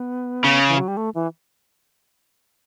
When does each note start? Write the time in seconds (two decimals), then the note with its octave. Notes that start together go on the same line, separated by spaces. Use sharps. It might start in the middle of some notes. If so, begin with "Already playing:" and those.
Already playing: B3
0.44 C#3
0.68 E3
0.78 F#3
0.88 G3
0.97 A3
1.15 E3